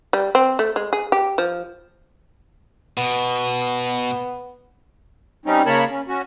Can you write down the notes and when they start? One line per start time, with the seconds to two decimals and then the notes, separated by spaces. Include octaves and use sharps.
0.13 G3
0.35 C4
0.59 A3
0.76 G#3
0.93 G#4
1.12 G4
1.38 F3
2.97 B2 B3
5.46 G3 C4 C#4 D#4
5.66 C#3 A#3 A#4 C#5 A5 B5
5.90 C#4
6.08 C#4 F#4